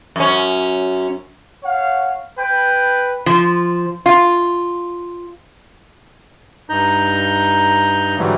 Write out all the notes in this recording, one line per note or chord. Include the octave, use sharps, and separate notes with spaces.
F#2 C#4
C#5 F5 F#5
B4 G5
F3
F4
G2 D#4 A#5 G6
G#2 D3 E3 F#3 G3 A3